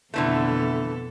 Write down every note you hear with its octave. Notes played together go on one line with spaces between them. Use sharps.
F2 B2 D3 E3 A3 A4